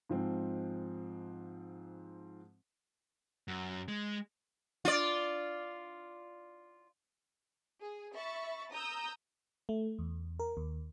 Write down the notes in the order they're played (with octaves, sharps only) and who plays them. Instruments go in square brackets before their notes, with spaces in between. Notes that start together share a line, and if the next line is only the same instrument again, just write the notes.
[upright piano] G#2 F3 C4
[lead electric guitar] F#2
G#3
[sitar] F4 D5
[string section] G#4
E5 B5 C#6 A6
A#5 D#6 E6 G6
[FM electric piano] A3
E2
A#4
D#2